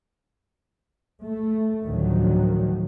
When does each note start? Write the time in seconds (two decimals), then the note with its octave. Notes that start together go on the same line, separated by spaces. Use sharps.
1.25 A3
1.83 A1 D2 D3 D#3 F3 F#3